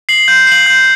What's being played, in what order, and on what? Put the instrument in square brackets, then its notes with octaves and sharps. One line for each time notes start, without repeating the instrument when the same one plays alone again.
[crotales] C7 F#7
G6
C7 F#7
G6